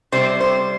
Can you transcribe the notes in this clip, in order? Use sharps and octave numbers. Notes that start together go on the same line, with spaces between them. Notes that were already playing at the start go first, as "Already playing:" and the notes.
C3 G3 C4 C5
C5